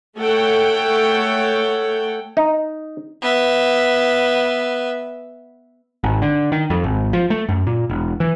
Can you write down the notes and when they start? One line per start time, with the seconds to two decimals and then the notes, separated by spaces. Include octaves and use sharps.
0.18 A3 A4 C#5 F#5 G5
2.37 D#4
3.22 B3 E5
6.04 G#1
6.22 D3
6.52 D#3
6.70 F2
6.84 G#1
7.13 F3
7.30 A3
7.49 F#2
7.67 A#2
7.90 E1
8.20 E3